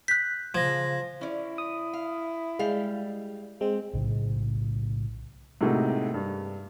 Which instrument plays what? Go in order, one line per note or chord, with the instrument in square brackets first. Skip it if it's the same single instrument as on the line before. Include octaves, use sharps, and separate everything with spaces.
[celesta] F#6 G6 [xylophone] B6
[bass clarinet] C#3 [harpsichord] F3 [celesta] G#6 A#6
[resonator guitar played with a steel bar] C#4 D5 [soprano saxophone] E4
[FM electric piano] D#6
[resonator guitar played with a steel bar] F5
[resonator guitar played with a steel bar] G3 F5 [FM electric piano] G#3
[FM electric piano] G#3 [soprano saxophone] C4
[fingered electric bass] B1 A2 C#3
[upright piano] A2 C3 G#3 A#3 D#4 F#4
G2